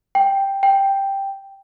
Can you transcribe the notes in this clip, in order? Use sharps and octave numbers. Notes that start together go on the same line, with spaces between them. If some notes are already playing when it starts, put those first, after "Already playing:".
G5
G5